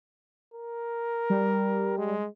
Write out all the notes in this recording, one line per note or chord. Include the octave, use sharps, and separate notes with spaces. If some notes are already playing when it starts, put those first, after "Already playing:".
A#4
G3
G#3